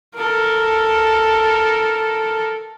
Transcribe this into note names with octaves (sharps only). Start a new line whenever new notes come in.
A4 A#4